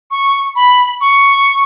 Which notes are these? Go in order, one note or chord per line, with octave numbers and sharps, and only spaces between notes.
C#6
B5
C#6